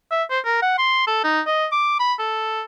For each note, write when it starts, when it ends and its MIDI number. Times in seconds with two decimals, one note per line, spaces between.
0.11 0.23 76
0.30 0.40 72
0.45 0.60 70
0.62 0.73 78
0.78 1.04 84
1.07 1.23 69
1.24 1.41 63
1.47 1.66 75
1.72 1.99 86
2.00 2.13 83
2.19 2.62 69